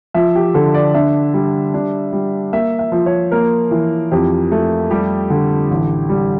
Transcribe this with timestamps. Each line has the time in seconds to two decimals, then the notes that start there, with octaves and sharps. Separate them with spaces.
0.14 F3 E5
0.35 G4
0.54 D3 A4
0.74 D5
0.94 D4 E5
1.34 G3
1.74 D4
2.13 G3
2.53 A#3 E5
2.79 E5
2.92 F3
3.06 C#5
3.32 A#3 A#4
3.71 E3
4.11 F2 G4
4.52 A3
4.91 G3 G4
5.30 D3
5.71 A1
6.09 G3